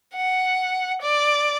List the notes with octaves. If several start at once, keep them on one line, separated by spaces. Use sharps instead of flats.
F#5
D5